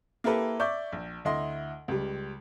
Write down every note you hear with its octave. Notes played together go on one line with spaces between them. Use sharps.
A#3 E4 G4 A4 B4
D5 E5 C#6 D6 G6
A#1
D2 E4 D#5 C6
C#2 G3